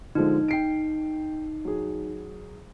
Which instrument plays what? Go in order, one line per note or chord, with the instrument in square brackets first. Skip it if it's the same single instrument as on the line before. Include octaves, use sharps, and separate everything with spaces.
[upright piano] D3 F3 G#3 [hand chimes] D#4
[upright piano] G5 C7 D7
F#3 G#4